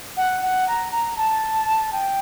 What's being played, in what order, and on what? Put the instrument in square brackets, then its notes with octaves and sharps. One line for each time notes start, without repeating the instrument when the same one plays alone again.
[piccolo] F#5
F#5
A#5
A#5
A5
G5